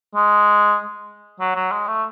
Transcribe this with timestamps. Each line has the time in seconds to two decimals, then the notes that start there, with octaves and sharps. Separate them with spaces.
0.15 G#3
1.40 F#3
1.56 F#3
1.72 G#3
1.88 A3